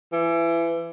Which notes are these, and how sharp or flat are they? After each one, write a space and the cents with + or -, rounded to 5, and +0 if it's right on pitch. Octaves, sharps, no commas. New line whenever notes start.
E3 +25